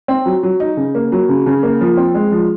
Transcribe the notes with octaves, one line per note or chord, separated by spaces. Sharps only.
C4
F#3
F#3
D#4
C#3
A#3
F#3
C#3
C#3
A#3
F3
C4
G#3
F3